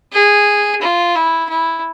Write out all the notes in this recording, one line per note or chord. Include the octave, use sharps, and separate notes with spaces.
G#4
F4
E4
E4